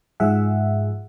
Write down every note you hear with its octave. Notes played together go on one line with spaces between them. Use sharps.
G#2 F3 G#4 E5 F#5